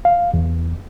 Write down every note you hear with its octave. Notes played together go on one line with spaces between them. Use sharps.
F5
E2